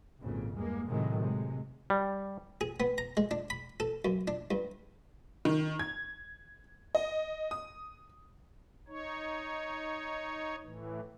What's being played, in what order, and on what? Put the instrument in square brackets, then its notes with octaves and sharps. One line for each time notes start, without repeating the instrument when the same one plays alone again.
[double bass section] G#1 F2 A#2 C#3
E2 G2 G#3 A#3
A2 C3 D#3 F#3 G#3
C3 G#3
[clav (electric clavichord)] G3
[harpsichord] G#4
B3
A#5
G#3
D4
B5
A4
F#2
D4
G2
[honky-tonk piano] D#3
G#6
D#5
D#6
[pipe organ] D#4 C#5
A2 E3